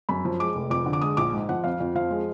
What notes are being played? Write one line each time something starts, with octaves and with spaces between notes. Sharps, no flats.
F#2 B5
F3
G#3 D6
F1
F2 D6
D3
D6
G#3 D#6
A#1 D6
G#2
F3 F#5
F2 F5
F2
F3 F5
G#3